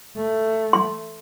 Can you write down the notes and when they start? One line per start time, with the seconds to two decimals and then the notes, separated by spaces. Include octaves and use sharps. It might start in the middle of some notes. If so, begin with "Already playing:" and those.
0.16 A3
0.73 C6